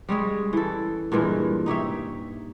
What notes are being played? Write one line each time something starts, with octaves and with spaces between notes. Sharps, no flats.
G3 G#3 C#4 G#4
E3 A4
G2 A#2 E3 G#3
D#4 G4 C#5 E5